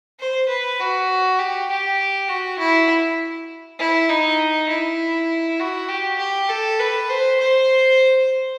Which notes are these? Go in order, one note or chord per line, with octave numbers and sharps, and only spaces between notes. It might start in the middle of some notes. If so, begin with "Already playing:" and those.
C5
B4
F#4
G4
G4
F#4
E4
E4
D#4
E4
F#4
G4
G4
A4
B4
C5
C5